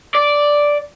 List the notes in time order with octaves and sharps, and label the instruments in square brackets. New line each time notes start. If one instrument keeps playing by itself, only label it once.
[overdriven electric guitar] D5